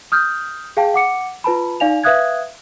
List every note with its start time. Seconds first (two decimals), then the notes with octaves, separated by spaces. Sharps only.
0.12 D#6 F6 G6
0.77 G#4 F5 G5 A5
0.94 F#5 D6 C#7
1.44 F4 B4 A5 B5
1.80 D#4 D5 F5 G#5 F7
2.04 B4 E5 F5 D#6 F#6 G#6